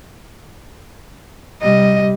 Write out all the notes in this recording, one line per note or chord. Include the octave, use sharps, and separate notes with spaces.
C3 G3 D#5